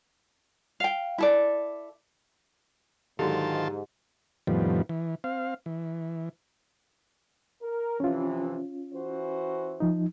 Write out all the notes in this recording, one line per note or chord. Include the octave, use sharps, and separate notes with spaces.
F5 G5
E4 A4 D5
G#2 D3 D#3 F#3 F4 G4 A5
F2 A2 D#3 F3 G3 B3
E3
C4 F5
E3
A#4
C3 E3 F3 C#4 F4
E3 F#4 C5
F3 D#4